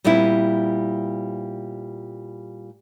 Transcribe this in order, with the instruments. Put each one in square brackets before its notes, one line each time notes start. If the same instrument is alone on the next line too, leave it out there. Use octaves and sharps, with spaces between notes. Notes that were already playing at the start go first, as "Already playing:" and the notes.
[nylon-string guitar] A#2 G3 B3 C4 E4